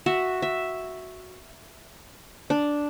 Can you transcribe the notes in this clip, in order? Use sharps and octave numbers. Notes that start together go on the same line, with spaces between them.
F#4 E5
E5
D4